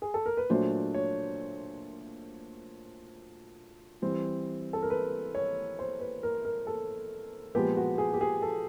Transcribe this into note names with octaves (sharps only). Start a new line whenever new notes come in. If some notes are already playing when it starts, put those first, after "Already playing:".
G#4
A4
A#4
B4
A#2 F#3 A3 D4 C5
C#5
E3 G3 C4
A4
A#4
B4
C#5
C5
B4
A#4
A#4
A4
A#2 F3 G#3 B3 G4
F#4
G#4
G4
G#4
A4